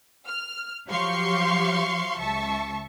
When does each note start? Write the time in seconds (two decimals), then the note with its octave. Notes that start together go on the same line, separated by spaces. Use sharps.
0.27 F6
0.87 F3 F#3 G4 F5 C6 C#6
2.19 C#2 E5 A5 C#6